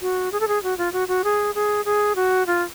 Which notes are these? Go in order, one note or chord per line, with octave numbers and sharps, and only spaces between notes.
F#4
G#4
A4
G#4
F#4
F4
F#4
F#4
G#4
G#4
G#4
F#4
F4